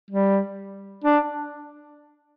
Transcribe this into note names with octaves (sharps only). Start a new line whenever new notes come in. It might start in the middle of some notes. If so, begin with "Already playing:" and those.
G3
D4